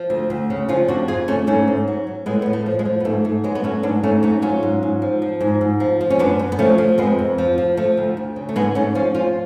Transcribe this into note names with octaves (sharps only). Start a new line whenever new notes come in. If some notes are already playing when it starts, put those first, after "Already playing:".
Already playing: F3
D2
D2
C#3
F3 C#4 F4
F2 D4 F#4
F2 F4 G#4
D3 A3 C#4
G#2 A3 C#4
G#2
F#3
F#3
A2 G#3 B3
A2 B3
A3
F3
G#3
F3
B3
G#2 A3
G#2 A3
F#3 G#3 B3
B3
F#3 A3 C#4
G#2 B3 D4
G#2 A3 C#4
F#3 A3 C#4
F#3 C#4 F4
G#2
G#2
F3
F3
G#2
G#2
F3
F3
C#4
F#2 B3 D4
F#2
B3
F3 A3 C#4
F3
F2 G#3 B3
F2
F3
F3
F3 A3
D2
D2
C#3
A3
G#2 G#3 B3
G#2 A3 C#4
F3 C#4 F4
F3 C#4 F4